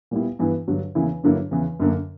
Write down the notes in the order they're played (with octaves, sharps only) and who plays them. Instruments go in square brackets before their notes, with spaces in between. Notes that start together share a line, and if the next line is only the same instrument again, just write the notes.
[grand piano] A#2 G3 B3 E4
G2 E3 B3 E4
G2 D3 F#3
E2 C#3 E3 A#3 E4
G2 D3 F#3 A#3 E4
E2 C#3 E3
F#2 D3 A#3